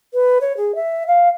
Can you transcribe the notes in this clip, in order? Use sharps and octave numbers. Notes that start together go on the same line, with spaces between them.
B4
C#5
G#4
E5
F5